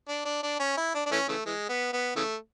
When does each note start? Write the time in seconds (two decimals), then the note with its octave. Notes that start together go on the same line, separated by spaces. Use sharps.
0.08 D4
0.25 D4
0.43 D4
0.59 C#4
0.77 E4
0.94 D4
1.06 D4
1.11 E3 A3 C#4
1.28 C#3 E3 A3
1.46 E3 G#3
1.69 B3
1.93 B3
2.16 C#3 E3 A3